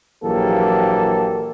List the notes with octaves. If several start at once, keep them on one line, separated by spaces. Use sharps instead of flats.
A#1 E3 F#3 A#3 G4 A4